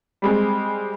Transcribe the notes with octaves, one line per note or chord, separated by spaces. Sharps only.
G3 G#3 C4